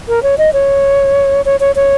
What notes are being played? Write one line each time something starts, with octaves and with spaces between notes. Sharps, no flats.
A#4
C#5
D#5
C#5
C#5
C#5
C#5